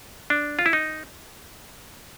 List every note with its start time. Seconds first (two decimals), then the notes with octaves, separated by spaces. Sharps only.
0.30 D4
0.59 F4
0.66 E4
0.73 D#4